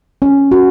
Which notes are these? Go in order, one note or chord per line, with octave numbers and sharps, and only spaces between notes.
C#4
F#4